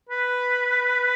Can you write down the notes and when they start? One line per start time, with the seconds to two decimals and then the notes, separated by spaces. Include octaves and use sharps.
0.09 B4